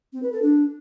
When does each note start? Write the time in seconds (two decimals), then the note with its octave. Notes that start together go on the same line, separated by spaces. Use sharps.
0.13 C4
0.23 B4
0.32 A4
0.42 D4